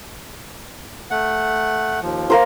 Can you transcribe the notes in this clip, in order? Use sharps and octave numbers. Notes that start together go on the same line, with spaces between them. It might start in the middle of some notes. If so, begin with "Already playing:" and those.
A3 F#5
D#2 F3
A#3 A#4 C5